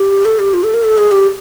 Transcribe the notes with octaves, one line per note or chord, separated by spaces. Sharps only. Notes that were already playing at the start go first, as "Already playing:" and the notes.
Already playing: G4
A4
G4
F4
A4
A#4
A4
G#4
G4